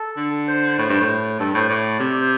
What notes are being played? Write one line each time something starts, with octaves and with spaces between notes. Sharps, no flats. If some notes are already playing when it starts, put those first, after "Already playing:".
Already playing: A4
D3
C5
A2
G2
A2
G2 A4
A2 C5
A2 D5
C3
C5